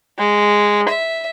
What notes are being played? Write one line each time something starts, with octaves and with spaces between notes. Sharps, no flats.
G#3
E5